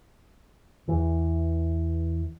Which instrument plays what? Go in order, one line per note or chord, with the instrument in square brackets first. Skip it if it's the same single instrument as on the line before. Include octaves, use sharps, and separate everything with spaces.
[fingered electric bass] E2 E3